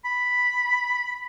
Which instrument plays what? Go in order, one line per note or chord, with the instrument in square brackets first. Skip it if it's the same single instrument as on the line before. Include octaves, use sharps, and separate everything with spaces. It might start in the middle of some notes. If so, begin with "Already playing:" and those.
[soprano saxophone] B5